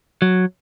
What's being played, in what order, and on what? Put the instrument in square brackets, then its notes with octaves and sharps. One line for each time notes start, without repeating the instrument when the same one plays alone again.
[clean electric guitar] F#3